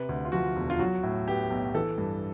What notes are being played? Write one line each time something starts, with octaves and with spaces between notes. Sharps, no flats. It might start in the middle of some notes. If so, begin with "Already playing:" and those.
Already playing: C3 B4
D2
F4
F3 F#4
E1
F4
F#3 F#4
A2
B3 G4
B1
E3 A4
G2